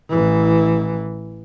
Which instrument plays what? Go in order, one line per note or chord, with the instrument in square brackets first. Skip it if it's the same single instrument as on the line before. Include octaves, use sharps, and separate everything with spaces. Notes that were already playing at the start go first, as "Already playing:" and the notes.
[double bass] A1 E3